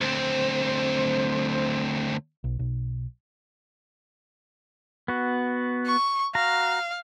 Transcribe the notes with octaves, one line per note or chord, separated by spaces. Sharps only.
D2 C4 C5
B1
B1
B3 F#4
C#6
F#4 F5 A#5